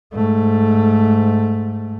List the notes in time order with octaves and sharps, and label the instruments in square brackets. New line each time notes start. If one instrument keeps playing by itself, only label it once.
[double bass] G#2 A3